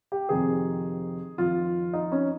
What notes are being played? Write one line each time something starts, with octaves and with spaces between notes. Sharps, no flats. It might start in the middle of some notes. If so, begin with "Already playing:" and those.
G4
F2 C3 D#3 G#4
F2 D#3 F4
D#4
C#4